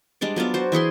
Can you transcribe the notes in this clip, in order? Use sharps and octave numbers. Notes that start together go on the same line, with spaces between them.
G3 G#3 D4 D5
F#3 B3 F4 D5
F#4 C5
E3 E4 G#4 C6